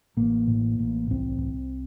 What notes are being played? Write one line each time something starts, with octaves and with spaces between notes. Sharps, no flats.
A1 A#3
A2
A1
C2 C4
C2